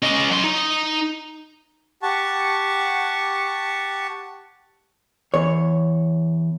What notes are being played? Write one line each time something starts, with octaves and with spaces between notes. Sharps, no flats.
C#4 D#5
F#3 C6
D#4
G4 F#5 A5 C#6
E2 C#5